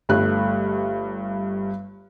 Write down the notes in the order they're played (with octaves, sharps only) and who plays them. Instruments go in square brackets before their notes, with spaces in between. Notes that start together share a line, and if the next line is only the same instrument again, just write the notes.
[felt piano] G1 G2 A3 F#6